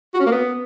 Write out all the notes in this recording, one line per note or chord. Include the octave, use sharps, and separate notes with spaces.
F#4
C#4
A#3
B3